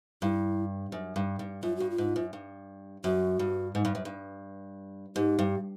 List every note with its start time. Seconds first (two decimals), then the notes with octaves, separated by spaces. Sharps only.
0.22 G2 E4
0.92 F#2
1.16 G2
1.39 G2
1.63 F#2 F4
1.77 G2 F#4
1.90 F4
1.98 G#2
2.16 F#2
2.33 G2
3.04 F#2 F#4
3.39 G2
3.75 G#2
3.85 G2
3.95 F#2
4.05 G2
5.16 G#2 G4
5.39 G2